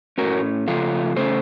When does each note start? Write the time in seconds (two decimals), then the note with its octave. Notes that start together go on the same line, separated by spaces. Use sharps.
0.18 A2 A3 C#4 F#4 A#4
0.68 C#3 F3 A3 F4 A4
1.16 C#3 A3 C#4 A4 C5